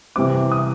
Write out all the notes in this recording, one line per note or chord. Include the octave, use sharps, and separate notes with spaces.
C3 E3 G3 C4 D6
D#6